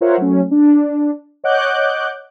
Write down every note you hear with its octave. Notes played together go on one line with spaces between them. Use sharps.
F4 A#4 C5 C#5 E5 F#5
F#3 A3 C#4
D4
C#5 D#5 F#5 D6 F#6 G6